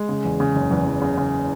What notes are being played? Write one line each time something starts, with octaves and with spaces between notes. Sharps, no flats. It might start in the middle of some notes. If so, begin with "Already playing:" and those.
Already playing: G#3
C#3
E2
C#3
F#1
E2
E2
C#3
C#3